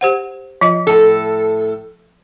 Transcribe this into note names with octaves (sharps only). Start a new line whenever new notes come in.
G4 C5 F#5
F3 F4 D#5
A2 A4